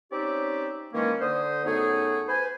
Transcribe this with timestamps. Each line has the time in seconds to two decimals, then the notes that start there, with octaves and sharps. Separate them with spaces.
0.11 C4 C#4 D#4 G4 D5 E5
0.94 D#3 E3 G#3 A#3 C#4
1.21 D3 C5 D#6
1.65 F#2 A3 B3 D#4 G#4
2.28 B4 C5 G#5